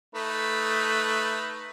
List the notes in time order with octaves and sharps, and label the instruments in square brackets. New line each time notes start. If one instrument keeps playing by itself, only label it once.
[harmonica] A3 D#4 B4